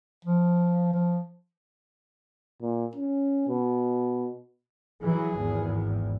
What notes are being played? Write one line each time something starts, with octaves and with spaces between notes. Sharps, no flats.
F3
F3
A#2
C#4
B2
E3 F#3 G#4
G#1 E2